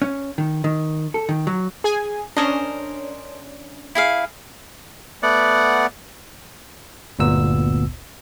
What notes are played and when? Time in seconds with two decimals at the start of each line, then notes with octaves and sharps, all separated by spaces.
0.02 C#4
0.38 D#3
0.64 D#3
1.14 A4
1.29 D#3
1.47 F#3
1.84 G#4 G#5
2.37 C#4 D4 A#4 C5 D#5
3.95 E4 G#4 F5
5.23 A3 B3 D5 F#5
7.19 G1 D2 A#2 B3 E6